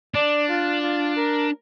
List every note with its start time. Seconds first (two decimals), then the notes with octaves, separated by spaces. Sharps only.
0.14 D4 D5
0.49 F4
0.83 F4
1.17 A#4